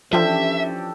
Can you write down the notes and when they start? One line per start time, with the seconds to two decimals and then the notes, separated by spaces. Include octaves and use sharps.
0.13 E3 F3 C#4 D4 G4 A4 E5 G5